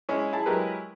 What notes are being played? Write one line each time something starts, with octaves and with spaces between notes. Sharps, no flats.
G#3 C#4 E4
E4 G#4 A5
F#3 G#3 E4 G4 A#4 B4